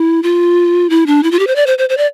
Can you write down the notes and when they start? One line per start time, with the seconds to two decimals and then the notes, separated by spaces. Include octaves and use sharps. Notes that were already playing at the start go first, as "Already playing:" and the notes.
Already playing: E4
0.23 F4
0.90 E4
1.07 D4
1.23 E4
1.31 F4
1.39 G4
1.47 C5
1.56 D5
1.67 C5
1.78 C5
1.89 C5
1.97 D5